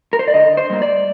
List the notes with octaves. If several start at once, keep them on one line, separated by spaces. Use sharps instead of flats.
A#4
C5
D5
D3 D#5
C5
G3 A#3
D5